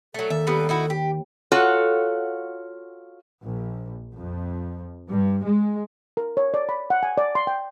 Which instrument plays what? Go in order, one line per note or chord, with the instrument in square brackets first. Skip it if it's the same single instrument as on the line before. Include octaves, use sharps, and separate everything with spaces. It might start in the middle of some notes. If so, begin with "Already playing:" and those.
[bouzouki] F#3 A3 [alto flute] A4
[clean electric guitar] D#2 [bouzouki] E5
[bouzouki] G3 A#3 B3
D#4 E4 F#4
G4
[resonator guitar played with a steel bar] F4 F#4 A4 C#5 F#5
[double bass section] A#1
F2
G2
G#3
[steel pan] A#4
C#5
D5
B5
F#5
G#5
D5
C6
G5